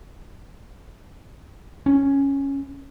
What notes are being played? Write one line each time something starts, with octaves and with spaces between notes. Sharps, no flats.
C#4